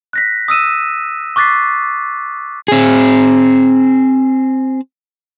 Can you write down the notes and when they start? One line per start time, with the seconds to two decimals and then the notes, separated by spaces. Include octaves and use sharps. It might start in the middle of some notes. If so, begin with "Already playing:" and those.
0.13 F#6 A#6 B6
0.48 D#6 E6 D#7 E7
1.36 C#6 D6 F#6 A6 B6 C7
2.68 C4 G#4